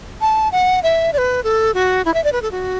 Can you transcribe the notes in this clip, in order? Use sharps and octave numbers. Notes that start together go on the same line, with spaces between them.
A5
F#5
E5
D5
B4
A4
F#4
E4
E5
D5
B4
A4
F#4